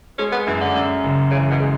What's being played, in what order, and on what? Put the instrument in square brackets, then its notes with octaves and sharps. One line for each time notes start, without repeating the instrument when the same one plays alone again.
[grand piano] G#3 [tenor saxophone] C#4
[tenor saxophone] B3
[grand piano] F#2 [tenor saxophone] E3
[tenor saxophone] D3
[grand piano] F#2
F#1
[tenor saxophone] C#3 [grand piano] E3
[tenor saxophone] B2
[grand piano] G#3